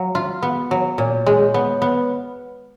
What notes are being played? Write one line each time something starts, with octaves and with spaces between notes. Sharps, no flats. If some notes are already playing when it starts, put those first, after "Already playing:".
Already playing: F#3 F5
F4
B3
F#3
A#2 C#5
G#3 C#5
B3 C#5
B3 B4